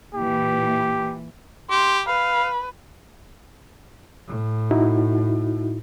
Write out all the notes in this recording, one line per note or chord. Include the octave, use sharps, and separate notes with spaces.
A#2 E3 G4
G4 C6
B4 F5
A2
D#4 E4 F#4